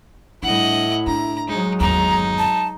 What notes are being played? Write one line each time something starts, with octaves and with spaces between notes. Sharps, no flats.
A2 G3 D4 E4 D#5 F#5
D4 A#5
F#3 G#3 D#4
G1 D#2 D#4 A#5
A5